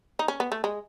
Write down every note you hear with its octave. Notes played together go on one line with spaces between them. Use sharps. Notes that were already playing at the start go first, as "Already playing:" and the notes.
D#4
C#4
B3
A3
G#3